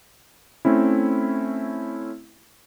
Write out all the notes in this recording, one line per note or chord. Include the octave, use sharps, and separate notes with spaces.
A3 C4 C#4 E4